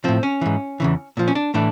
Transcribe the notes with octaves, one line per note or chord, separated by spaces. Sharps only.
A2 F3 C4
C#4
G#2 E3
E2 C#3 E3
A#2 F3
C#4
D4
A2 E3 D4